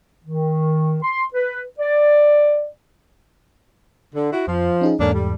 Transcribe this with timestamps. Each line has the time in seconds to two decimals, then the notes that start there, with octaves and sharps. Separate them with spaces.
0.25 D#3
1.03 C6
1.34 B4
1.79 D5
4.14 D3
4.33 E4 F#4
4.47 F2 F3
4.81 C#4 D#4 G#4
4.99 E2 G#2 A#3 C#4 D4 A4
5.14 G3